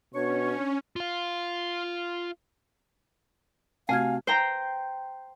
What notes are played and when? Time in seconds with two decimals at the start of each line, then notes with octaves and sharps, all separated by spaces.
0.14 B2 C#4 D4 C#5 C#6
0.96 F4 F5
3.89 C3 A3 F#4 F5 G#5 F6 G#6
4.27 C5 G5 A#5